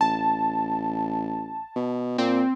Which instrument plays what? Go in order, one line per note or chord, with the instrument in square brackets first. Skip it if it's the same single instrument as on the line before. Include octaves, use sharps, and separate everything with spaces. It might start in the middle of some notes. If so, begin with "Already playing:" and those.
[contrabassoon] A1 [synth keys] A5
[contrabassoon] B2
[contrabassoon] A#2 [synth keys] C4